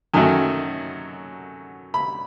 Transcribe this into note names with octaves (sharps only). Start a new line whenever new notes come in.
F#2 D#3 F#3 A3 G#5
B5